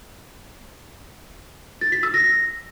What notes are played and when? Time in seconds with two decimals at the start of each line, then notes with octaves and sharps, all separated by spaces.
1.81 A6
1.92 B6
2.03 E6
2.14 A#6